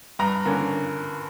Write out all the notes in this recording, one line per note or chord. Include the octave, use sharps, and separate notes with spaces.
G2 A#5
D3 A#3 C#4